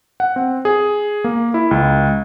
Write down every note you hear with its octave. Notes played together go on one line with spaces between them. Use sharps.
F#5
C4
G#4
A#3
E4
C#2